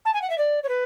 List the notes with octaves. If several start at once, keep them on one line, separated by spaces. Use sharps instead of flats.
A5
G#5
F#5
E5
D5
C#5
B4